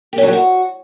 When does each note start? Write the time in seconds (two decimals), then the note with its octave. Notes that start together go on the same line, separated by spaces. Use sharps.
0.13 G4
0.18 C#4
0.23 F#3
0.28 G4
0.33 F#4